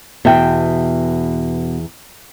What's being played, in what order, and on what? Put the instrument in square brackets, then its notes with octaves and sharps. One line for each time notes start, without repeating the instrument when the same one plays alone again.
[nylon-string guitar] E2 E5 G5 [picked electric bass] B2